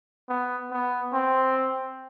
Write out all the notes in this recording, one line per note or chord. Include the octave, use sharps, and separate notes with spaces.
B3
B3
C4